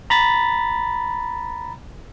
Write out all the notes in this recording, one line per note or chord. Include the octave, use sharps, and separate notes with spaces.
A#5 B5 A6